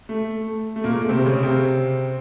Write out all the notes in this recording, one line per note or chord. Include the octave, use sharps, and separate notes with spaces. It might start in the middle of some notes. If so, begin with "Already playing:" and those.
A3
A3
A#2 A#3
G#3
A3
C3 C4
C#3 C#4
C3 C4